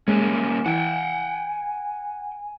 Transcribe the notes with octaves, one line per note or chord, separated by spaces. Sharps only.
G3 G#3 A#3 C#4 G#5
E3 F#5 G5